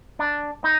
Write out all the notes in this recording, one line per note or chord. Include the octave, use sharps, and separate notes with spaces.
D4
D#4